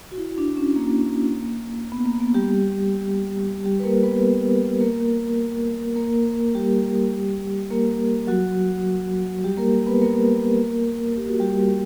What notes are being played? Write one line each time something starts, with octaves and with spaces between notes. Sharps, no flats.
F#4
E4
D4
C#4
A#3
B3
A#3
B3
G3 G4
G3 G4
B4
A#3 A#4
B3 B4
B3 B4
A#3 A#4
A#3 A#4
G3 G4
A#3 A#4
F#3 F#4
G3 G4
A#3 A#4
B3 B4
A#3 A#4
G4
F#4
G3 G4